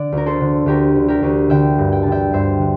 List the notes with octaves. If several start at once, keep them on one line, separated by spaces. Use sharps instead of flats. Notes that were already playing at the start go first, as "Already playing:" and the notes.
Already playing: D3 D5
D2 A#4
A4 C5
D3
D2 G4 A#4
D3
G4 A#4
D2
D3 E5 G5
G2
G5
D3 A5
E5 G5
G2 C5 E5
D3